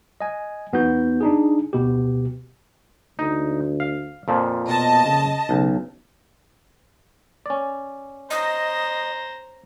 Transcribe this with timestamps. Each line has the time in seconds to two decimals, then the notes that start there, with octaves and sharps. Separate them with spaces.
0.21 D#5 G#5
0.73 E2 B3 D#4 F#4 G6
1.21 D4 D#4 G#4
1.73 D2 B2 G4
3.19 D2 D#4
3.80 F5
4.28 F2 A#2 F3
4.68 B2 D#5 A5
5.06 C#3
5.49 B1 C#3
7.46 C#4 D5
8.30 C5 D#5 A#5